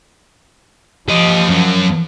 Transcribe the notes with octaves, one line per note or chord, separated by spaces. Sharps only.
F3 G4 D#5
F#2 F#3